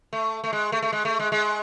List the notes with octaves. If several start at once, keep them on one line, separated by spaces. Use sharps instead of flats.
A3
A3
G#3
A3
A3
G#3
A3
G#3
G#3